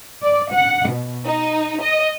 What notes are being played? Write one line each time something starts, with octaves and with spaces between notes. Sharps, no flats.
D5
F#5
B2
D#4
D#5